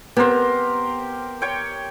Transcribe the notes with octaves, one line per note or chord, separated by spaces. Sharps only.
B3 C4 G4 A#4 C5
C#5 G5